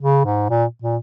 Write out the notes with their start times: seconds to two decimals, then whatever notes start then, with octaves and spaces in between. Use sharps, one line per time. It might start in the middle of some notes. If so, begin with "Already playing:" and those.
0.01 C#3
0.25 G#2
0.50 A#2
0.82 A#2